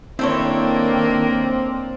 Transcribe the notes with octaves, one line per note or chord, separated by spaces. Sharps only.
D#3 A#3 C4 D4 E4 A4 C#5